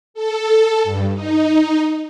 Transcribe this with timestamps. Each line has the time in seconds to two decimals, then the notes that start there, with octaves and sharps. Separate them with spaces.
0.14 A4
0.84 G2
1.13 D#4